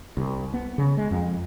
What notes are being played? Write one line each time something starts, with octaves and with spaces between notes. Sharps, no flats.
C2
B3
C#3
G#3
F2